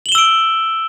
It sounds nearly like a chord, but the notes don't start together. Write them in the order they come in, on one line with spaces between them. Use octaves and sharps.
F#7 G7 E7 E6 D7